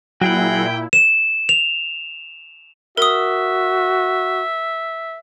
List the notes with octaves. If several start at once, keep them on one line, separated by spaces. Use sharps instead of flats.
A#2 F#3 E4 F#4 G#4 F#5 G5
E7
F7
F#4 A#4 E5 D#6